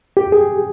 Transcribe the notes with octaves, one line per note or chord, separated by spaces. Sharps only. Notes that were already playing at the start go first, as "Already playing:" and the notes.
G4
G#4